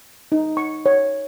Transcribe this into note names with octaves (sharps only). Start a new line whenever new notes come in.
D#4
C#6
C#5